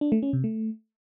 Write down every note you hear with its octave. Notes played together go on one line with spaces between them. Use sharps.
D4
A3
C#4
C3
A3